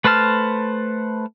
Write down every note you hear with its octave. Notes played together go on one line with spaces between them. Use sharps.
A3 B4 C5 A5 F6